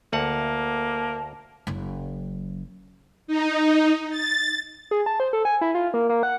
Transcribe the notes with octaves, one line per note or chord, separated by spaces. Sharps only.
D2 A#3 F#5 A5
F#1 F#3
D#4
A6
G#4
A5
C5
A4
G#5
E4
F4
A#3
A#3
F#5